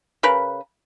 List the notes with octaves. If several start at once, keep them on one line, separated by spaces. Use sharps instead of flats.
C#3 A#4 B4